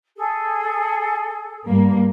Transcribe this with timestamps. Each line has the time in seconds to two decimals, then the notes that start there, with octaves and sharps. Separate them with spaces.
0.16 G#4 A4
1.68 G2 A#3